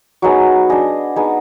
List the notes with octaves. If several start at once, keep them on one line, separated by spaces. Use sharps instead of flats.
F#3 B3 D#4 G#4
D4 G#4 D#5
B3 D#4 G#4